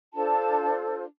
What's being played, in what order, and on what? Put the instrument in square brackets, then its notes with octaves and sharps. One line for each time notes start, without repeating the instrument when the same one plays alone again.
[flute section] D4 F4 A4 C5 A5